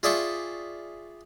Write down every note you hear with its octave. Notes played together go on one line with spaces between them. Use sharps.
F4 G#4 D5 E5 G5 C#6